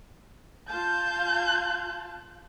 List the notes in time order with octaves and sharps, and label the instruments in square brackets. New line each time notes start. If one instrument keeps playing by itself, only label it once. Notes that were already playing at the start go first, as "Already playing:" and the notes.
[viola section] F4 F5 A5 [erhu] G6